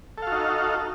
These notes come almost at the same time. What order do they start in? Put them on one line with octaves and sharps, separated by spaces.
A4 F5 F#4 D#4